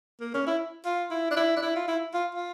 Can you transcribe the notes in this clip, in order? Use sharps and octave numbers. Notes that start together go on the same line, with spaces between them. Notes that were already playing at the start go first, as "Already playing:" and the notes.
A#3
C#4
E4
F4
E4
D4
E4
D4
E4
F4
E4
F4
F4